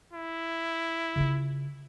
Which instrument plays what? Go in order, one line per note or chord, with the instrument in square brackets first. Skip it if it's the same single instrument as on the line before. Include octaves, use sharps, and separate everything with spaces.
[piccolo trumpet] E4
[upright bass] C#3 F4